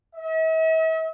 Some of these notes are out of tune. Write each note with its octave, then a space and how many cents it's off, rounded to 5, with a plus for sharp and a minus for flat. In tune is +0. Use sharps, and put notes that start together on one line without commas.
E5 -45